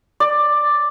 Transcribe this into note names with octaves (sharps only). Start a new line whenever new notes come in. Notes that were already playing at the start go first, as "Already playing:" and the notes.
D5